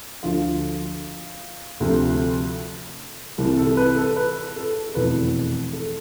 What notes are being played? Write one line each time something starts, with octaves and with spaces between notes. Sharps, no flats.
D2 D3 F3 F4
D2 C3 F3 A4
C2 C3 E3
A4
B4
A4
B4
A4
A4
F1 E2 B2 B4
A4